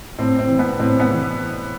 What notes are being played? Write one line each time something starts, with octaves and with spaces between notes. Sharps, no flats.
A2 C4
C4
E3
B3
A2 C4
B3
E3